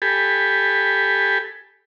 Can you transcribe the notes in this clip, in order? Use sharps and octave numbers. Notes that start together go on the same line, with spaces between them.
G4 A4 G#5 B5